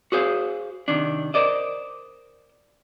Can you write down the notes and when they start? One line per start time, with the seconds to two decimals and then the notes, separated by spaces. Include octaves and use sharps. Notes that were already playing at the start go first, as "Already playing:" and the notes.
0.12 F#4 G#4 C5 F5
0.88 C3 D#3 D4
1.34 A#4 C5 D5 D#5